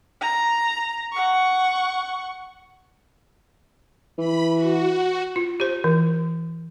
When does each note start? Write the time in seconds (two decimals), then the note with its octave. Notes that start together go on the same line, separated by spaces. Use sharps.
0.21 A#5
1.13 F#5 C#6
4.18 E3 B5
4.54 F#4
5.36 F4
5.60 G4 C5
5.84 E3